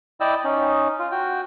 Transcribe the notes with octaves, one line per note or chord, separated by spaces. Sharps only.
E4 D5 D#5 G5 E6
C#4 D#4
F4
F#4 G5